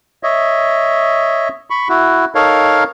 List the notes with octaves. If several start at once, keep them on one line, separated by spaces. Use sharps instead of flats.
C#5 D#5 E5
B5 C#6
E4 F#4
D#4 A4 A#4 C#5 F5